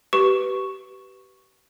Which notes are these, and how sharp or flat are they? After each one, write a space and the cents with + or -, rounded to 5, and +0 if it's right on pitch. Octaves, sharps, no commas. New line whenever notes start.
G4 -30 B4 +0 C#6 +0